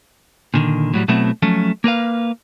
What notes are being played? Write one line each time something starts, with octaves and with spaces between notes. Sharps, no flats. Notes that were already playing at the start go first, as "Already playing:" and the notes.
A#2 D3 D#3
A2 F#3 G3
B2 F#3 A3 B3 C4 E4
F3 F#3 A3 C#4
A#3 A#4 B4 F5